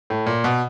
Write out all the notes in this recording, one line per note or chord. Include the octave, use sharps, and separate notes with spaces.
A2
A#2
B2